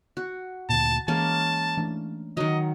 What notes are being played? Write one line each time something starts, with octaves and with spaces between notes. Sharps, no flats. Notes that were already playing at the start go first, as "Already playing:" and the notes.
F#4
D2 A#2 A5
E3 G#3 A#3 C#4 A5
E3 A3 D4
D#3 F#3 D#5